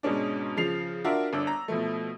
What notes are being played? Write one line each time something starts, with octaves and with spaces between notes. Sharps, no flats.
G#2 B2 G#3 C#4 D4
C#3 F3 C7 F7
D4 F4 F#4 A#4 E5
G1 D4 E6
A#5
B2 F3 A3